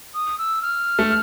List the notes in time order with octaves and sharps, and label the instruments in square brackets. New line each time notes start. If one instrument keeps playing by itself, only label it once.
[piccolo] D#6
E6
F6
[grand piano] A3